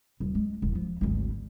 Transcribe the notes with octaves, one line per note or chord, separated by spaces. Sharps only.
D#1
G#3
E1
F3
G#1 D2